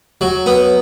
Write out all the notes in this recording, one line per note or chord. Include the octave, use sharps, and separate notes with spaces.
F#3
B3